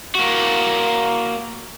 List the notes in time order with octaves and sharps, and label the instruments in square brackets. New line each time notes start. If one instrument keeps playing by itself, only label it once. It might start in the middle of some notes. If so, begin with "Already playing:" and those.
[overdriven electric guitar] A#3 F#4